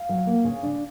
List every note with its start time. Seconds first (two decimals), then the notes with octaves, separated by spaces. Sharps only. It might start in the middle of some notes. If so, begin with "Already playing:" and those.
Already playing: F5
0.09 F#3
0.26 A#3
0.44 C#3
0.63 D4